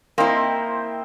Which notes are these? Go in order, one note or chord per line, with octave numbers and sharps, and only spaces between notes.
A#3 C4 E4 C5 D#5